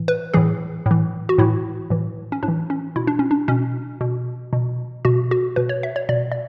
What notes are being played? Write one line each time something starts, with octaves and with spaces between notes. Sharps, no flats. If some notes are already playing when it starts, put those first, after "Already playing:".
Already playing: A2 E3
B4
A2 E3 G#4
A2 E3
F#4
A2 E3 E4
A2 E3
C#4
A2 D4
E3
C#4
B2 E4
D4
C#4
D4
B2 C#4
B2
B2
B2 F#4
F#4
B2 B4
C#5
E5
C#5
B2 D5
D5